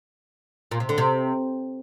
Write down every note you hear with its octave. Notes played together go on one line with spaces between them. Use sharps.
A#2
C3
D3
C3